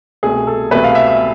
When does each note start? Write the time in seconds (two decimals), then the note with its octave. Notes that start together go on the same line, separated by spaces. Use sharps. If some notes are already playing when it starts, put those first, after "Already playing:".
0.23 C2 B2 A3 G#4
0.47 A4
0.71 C2 B2 A3 B4
0.84 F5
0.95 E5
1.07 E5